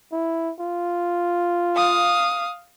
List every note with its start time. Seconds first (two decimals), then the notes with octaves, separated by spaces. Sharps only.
0.12 E4
0.60 F4
1.76 F5 D#6